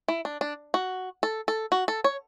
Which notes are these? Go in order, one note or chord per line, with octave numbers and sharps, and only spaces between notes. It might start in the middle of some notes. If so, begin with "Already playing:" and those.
E4
D4
D4
F#4
A4
A4
F#4
A4
C#5